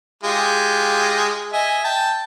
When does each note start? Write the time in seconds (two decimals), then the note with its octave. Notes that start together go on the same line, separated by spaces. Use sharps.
0.23 G#3 F4 G4
1.52 D#5 E5 G#5
1.84 G5 A5